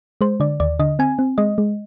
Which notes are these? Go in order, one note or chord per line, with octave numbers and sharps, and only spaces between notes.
G#3 C5
D3 D5
D#2 D5
D3 D#5
C4 G#5
C4
G#3 D#5
G#3